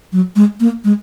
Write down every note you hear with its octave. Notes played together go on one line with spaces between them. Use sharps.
F#3
G#3
A#3
G#3